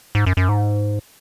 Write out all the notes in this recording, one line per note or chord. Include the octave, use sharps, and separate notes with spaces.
G#2
F#2
F#2
G#2